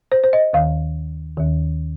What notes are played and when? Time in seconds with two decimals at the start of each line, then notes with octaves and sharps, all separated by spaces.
0.12 C5
0.24 C5
0.33 D#5
0.53 D#2 D#3 F5
1.37 D#2 D#3